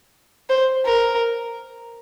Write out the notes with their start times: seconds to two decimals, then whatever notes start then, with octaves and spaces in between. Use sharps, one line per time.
0.49 C5
0.86 A#4